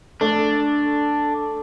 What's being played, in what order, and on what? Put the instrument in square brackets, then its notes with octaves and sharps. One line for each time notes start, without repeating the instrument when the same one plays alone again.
[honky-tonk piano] A3 [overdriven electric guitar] D4